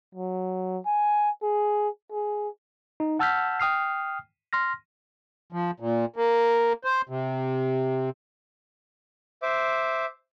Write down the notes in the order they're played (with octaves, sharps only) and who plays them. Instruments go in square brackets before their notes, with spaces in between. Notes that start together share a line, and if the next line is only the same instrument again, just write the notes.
[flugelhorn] F#3
G#5
G#4
G#4
[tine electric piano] D#4
F#5 A5 E6 F6 G6 B6
G5 D#6 F6 C7
C6 F6 A#6
[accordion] F3
A#2
A#3
C5
C3
[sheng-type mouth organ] C5 E5 D6